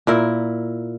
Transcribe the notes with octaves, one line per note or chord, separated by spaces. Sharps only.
A#2 E4 A#4